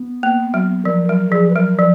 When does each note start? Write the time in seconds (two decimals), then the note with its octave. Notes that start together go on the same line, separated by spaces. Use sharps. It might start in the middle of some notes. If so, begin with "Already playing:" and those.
Already playing: B3
0.23 A#3
0.54 F#3
0.85 F3 A#4
1.08 F#3 A#4
1.32 F3 G#4
1.50 B4
1.55 F#3 A#4
1.79 F3